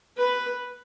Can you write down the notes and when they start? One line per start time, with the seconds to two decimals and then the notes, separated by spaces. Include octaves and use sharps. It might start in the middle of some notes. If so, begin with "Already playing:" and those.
0.17 B4